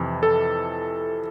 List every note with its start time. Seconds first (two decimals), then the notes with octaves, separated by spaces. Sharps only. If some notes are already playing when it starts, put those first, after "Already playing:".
Already playing: F2 C3 E3
0.23 A4